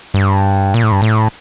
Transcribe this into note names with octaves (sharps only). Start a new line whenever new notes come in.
G2
A#2
A2
G2
A2